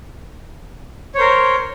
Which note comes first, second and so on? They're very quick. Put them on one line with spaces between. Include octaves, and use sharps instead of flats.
C#5 C5 A#4